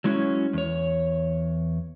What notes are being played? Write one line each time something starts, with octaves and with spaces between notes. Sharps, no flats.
F#3 G#3 C#4 E4 F#4
E2 C#5